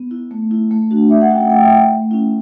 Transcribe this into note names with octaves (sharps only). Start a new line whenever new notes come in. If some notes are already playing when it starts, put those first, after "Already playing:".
Already playing: B3
E4
A3
E4
A3
D4 F#4
A3 E5
F#5
C#4 F#4 G5
F#5
A3 G5
E5
E4 F#5
A3
C#4 E4